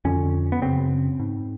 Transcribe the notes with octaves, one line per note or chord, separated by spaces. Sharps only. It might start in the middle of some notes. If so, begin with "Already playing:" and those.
F2 D3 C#4
B3
F#2 C#3 C4
G#2